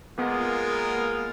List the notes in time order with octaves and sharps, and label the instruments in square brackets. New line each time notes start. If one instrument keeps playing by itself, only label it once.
[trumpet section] G#3 F4 A#4 [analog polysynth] A#3 B3